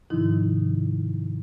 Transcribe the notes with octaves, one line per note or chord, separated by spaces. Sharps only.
G#2 C3 D#3 F3 D#4 E4